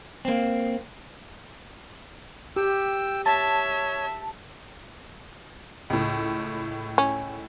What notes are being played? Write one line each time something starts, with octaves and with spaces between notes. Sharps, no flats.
A#3 C4
G4 G5 E6
C#5 E5 A5
C#2 A2
C#4